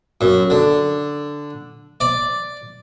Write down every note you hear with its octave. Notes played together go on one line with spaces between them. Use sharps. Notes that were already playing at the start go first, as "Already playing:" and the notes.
F#2
D3
D5